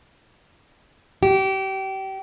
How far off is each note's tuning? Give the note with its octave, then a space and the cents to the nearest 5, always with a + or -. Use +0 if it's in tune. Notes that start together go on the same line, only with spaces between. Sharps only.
G4 -30